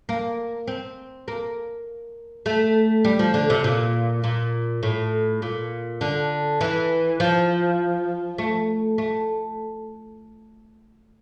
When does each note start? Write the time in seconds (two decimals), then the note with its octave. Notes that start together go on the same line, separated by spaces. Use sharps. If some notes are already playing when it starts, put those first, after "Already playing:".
0.09 A#3
0.67 C4
1.28 A#3
2.46 A3
3.05 G3
3.19 F3
3.34 D3
3.50 C3
3.64 A#2
4.24 A#2
4.83 A2
5.42 A#2
6.01 D3
6.61 E3
7.20 F3
8.38 A3
8.98 A3